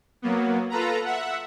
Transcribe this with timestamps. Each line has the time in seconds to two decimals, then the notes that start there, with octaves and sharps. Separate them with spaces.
0.22 F#3 A#3 B3
0.70 F4 A4 B4 A#5
1.04 E5 F#5